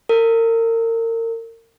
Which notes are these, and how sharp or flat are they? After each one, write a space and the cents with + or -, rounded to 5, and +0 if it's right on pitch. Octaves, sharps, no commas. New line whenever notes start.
A#4 -35